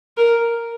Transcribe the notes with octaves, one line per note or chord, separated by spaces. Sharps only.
A#4